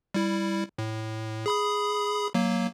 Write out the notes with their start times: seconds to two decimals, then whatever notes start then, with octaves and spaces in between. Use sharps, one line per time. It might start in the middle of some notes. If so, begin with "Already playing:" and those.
0.14 G3 E4
0.78 A2
1.46 G#4 B5 D#6
2.34 F#3 A#3